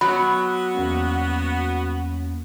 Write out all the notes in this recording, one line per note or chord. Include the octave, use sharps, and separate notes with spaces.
F#3 B3 F#4 B5
E2 A#3 C#4